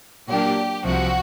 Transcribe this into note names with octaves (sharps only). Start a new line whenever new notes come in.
A#2 F#3 A#3 D4 G4
C2 C3 F3 F#4